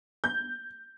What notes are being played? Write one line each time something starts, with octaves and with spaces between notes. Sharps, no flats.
G6